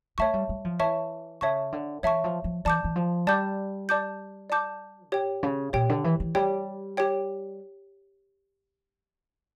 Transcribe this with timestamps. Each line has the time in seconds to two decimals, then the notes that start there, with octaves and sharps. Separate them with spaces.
0.18 A3 C#5 E5 A5 C#6
0.34 G3
0.49 G3
0.65 F3
0.80 E3 C#5 E5 A5 C#6
1.41 C#3 C#5 E5 A5 C#6
1.72 D3
2.03 E3 C#5 E5 A5 C#6
2.24 F3
2.44 F3
2.65 E3 D5 A5 D6 G6
2.84 E3
2.96 F3
3.27 G3 D5 A5 D6 G6
3.89 D5 A5 D6 G6
4.50 D5 A5 D6 G6
5.12 A2 G4 C#5 G5
5.43 C#3
5.73 A#2 G4 C#5 G5
5.89 D3
6.04 E3
6.20 E3
6.35 G3 G4 C#5 G5
6.97 G4 C#5 G5